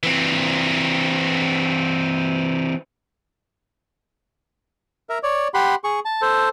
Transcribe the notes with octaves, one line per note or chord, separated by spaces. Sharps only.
E3 C4
A#4 E5
C#5 D5
G4 F#5 B5 C6
G#4 C#6
A5
A4 C5